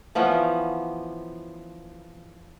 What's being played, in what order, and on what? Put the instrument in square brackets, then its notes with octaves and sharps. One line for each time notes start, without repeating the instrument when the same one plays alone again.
[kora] E3 F3 B3 C#4